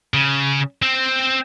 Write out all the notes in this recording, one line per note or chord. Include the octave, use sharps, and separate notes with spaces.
C#3
C4